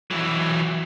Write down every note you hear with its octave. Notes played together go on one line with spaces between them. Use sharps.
E3 F#3